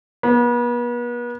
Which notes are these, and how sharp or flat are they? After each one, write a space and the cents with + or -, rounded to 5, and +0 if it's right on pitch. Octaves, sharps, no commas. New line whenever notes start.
B3 -40